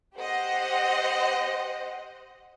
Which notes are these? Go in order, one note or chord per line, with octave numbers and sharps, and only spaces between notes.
G4 C5 D#5 F#5